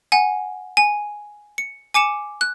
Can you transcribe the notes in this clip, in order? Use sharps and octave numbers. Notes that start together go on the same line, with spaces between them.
F#5 G#5
G#5
C#7
G#5 D6 C#7 E7
F#6